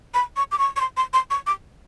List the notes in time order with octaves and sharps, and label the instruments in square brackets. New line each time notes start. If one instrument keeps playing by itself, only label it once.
[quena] B5
C#6
D6
C#6
C#6
C6
C6
C6
C#6
D6